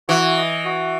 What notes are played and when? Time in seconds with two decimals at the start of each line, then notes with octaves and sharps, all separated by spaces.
0.09 E3 F#4
0.37 D#5
0.65 F#4